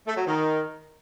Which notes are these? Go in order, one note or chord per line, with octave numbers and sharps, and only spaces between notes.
A3
F#3
D#3